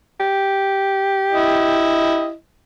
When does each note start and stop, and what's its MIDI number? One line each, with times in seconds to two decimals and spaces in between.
0.20 2.28 67
1.33 2.33 64
1.33 2.33 75